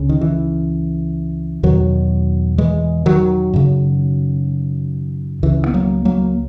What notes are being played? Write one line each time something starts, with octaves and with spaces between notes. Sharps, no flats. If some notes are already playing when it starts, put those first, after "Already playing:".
Already playing: C#2 C#3
D#3
E3
E2 B2 D#3 F#3
E3 G#3
D#3 F#3
F#2 C#3
C#2 C#3 E3
B3
F#3 A#3
F#3 A#3